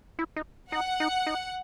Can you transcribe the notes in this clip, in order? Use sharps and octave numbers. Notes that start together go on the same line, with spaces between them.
E4
D#4
D#4 F#5
D#4
D#4